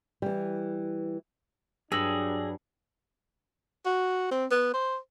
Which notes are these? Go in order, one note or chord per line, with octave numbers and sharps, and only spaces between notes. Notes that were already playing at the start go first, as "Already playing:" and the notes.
E3 G3
G2 F#3 D4 G#4 E6 A#6 F#7
F#4
C4
B3
C5